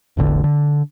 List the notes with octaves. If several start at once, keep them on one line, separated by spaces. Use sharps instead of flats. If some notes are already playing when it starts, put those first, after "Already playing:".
E1 A1 D3
D3